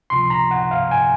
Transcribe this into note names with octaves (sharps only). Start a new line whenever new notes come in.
C#2 C3 F3 C6
A#5
F#5
F5
G#5